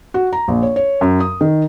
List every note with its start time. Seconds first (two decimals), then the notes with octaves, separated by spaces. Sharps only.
0.14 F#4
0.33 A#5
0.48 A#1
0.63 C#5
0.76 C#5
1.01 F#2
1.20 D#6
1.41 D#3